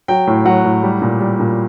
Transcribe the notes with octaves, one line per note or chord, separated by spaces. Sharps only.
F#3 G5
A2
F#3 F#5
A2
G3
A#2
G3
A#2